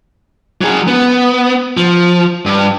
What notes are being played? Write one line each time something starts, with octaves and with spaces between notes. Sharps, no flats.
F#3 G#4
B3
F3
G2